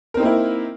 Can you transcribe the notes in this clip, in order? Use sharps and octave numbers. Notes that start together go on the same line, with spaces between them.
A#3 C4 D#4 E4 A#4